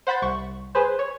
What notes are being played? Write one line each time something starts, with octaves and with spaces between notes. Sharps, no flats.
C5 F#5 B5 G6 A6
C2 C#6
G#4 B4 C5
C#5